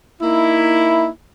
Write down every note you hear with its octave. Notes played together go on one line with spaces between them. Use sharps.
A#3 D#4 E4